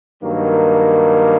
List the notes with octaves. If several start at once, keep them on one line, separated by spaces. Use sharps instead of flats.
G2 D#3 F#3 A#3